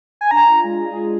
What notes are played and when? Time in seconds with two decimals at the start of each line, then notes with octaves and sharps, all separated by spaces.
0.21 G#5
0.31 D4 A#5
0.48 F4
0.63 G#3
0.80 G#4
0.96 D4